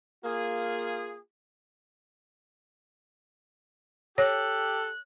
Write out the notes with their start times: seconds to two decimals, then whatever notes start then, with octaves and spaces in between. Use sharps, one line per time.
0.24 A#3 F4 G#4
4.18 G4 A4 C#5 F#6